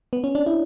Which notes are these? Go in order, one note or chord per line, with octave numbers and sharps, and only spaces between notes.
B3
C#4
D4
E4